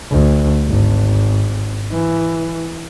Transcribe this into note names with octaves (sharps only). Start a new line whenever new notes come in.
D2
G#1
E3